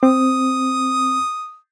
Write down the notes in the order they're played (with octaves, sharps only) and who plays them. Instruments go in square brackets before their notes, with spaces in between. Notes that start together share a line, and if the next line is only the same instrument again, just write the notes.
[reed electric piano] C4 [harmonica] D#6